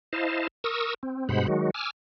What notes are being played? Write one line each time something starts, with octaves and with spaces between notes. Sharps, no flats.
E4 C5 D#5 F5 A5
A#4 C#6 D#6 E6
C4
G2 B2 G#3 C5 F#5 B5
D#3 F#3 G#3 F#4
G#5 D6 E6 F6